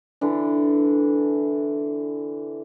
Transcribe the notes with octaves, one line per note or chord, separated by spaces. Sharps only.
D3 E3 D4